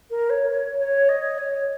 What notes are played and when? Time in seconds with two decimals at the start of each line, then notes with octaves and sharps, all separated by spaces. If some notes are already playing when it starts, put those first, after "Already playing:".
0.10 A#4
0.30 C#5
0.49 C#5
0.79 C#5
1.09 D#5
1.38 C#5